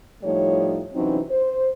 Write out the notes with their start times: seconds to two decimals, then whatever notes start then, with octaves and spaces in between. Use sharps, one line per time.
0.24 A2 F3 G3 A3 D#4 C#5
0.94 C3 E3 F#3 C4 C#4 D#4
1.30 C5